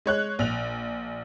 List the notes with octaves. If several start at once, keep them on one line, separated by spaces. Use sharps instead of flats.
G#3 C#5 F#6
A#1 F7